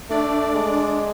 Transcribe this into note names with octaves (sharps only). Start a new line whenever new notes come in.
A3 D4 D5
G#3